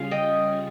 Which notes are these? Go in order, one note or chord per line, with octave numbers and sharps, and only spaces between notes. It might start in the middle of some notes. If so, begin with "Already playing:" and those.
Already playing: C#3 G3 C#4 F4 G#4 F5
D#5 G5